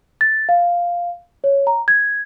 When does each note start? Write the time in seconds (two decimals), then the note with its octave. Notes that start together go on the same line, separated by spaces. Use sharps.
0.21 A6
0.49 F5
1.44 C#5
1.67 A#5
1.88 G#6